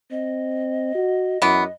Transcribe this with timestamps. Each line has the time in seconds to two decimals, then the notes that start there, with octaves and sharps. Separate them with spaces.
0.11 C4 D#5
0.95 F#4
1.42 F#2 E3 B3